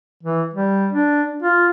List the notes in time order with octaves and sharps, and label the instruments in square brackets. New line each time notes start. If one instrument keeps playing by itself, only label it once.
[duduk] E3
G3
D4
F4